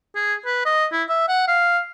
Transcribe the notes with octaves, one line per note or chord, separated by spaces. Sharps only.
G#4
B4
D#5
E4
E5
F#5
F5